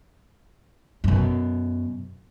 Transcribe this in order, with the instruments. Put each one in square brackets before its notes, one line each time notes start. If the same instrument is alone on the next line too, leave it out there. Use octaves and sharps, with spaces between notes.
[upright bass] F#2 B2